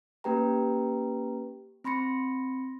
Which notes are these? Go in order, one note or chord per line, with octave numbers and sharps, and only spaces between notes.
A#3 C#4 G4 B4 G5 A#5
C4 B5 C6 A#6 C#7